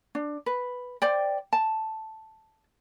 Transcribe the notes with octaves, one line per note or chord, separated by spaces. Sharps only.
D4
B4
C5 D5 G5
A5